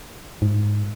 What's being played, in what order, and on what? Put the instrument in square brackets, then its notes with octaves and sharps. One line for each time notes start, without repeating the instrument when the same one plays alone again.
[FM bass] G#2